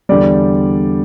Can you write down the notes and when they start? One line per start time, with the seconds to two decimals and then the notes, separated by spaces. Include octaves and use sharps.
0.09 E2 D3 G3 D5